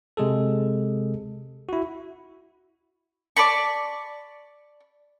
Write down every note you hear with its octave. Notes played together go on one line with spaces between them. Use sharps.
C3 G#3 G#4 A4
E4 F#4
D5 A5 B5 C#6